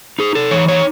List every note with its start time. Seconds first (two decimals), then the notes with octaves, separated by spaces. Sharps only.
0.19 D#4 G#4
0.35 A4
0.51 E3 C#5
0.68 C#5